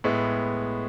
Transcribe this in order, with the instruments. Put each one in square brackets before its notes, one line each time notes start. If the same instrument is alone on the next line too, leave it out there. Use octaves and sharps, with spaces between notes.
[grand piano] A2 G#3 B3